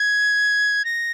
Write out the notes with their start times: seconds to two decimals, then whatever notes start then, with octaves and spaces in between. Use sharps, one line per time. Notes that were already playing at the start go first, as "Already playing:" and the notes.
Already playing: G#6
0.85 A#6